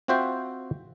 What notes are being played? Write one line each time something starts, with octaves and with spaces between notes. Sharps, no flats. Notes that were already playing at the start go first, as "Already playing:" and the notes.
C4 F4 F#4 C5 E5 G5